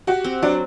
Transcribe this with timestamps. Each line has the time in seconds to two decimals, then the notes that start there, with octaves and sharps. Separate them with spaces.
0.07 F#4 G4
0.25 C4
0.43 F#3 D4